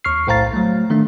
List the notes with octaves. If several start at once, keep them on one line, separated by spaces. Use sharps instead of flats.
D#2 C#6 F6 C7
B1 A2 C5 F5 A#5 A6
F#3 A3
D#3 A3 D4